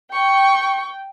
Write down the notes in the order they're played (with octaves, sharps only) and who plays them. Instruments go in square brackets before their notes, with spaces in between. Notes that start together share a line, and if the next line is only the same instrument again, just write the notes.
[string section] G5 [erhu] C#6